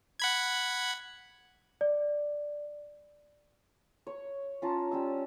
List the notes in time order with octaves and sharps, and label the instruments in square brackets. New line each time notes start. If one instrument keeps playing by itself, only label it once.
[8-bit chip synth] F#5 B5 G#6
[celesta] D5
[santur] C#5
C#4 F4 A5 A#5
G3 C#4 E6